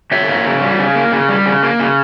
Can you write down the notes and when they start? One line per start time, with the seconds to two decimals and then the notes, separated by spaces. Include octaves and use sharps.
0.11 C#3 C#5 E5
0.29 A#3
0.46 C#3
0.62 G3
0.79 C#3
0.95 A#3
1.12 C#3
1.29 G3
1.46 C#3
1.63 A#3
1.80 C#3